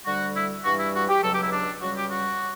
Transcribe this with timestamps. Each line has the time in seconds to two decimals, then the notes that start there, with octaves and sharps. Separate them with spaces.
0.06 D2 D3 G3 F#4
0.36 E4
0.64 G2 E3 G3 F#4
0.79 E4
0.94 F#4
1.09 G4
1.23 C#2 B2 F#3 A4
1.33 G4
1.43 E4
1.52 D4
1.82 C#2 C#3 G3 F#4
1.96 G4
2.11 F#4